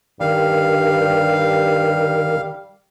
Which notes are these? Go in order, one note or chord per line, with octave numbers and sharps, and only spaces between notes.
G2 D#3 G3 F5